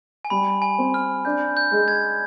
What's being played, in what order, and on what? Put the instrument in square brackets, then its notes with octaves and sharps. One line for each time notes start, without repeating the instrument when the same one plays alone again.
[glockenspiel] G#5
[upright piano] G3 [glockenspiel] B5
[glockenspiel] G#5
[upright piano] C4
[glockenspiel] F6
[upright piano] D4 [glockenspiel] G6
[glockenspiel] G6
[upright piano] G#3
[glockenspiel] G#6